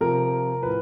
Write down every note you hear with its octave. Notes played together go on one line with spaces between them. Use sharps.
C3 F3 A#4
A2 F3 B4